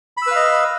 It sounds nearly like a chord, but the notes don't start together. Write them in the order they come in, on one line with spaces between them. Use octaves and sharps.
B5 E6 B4 F5 D#5